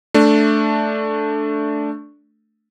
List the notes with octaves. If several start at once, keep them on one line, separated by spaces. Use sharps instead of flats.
A3 D4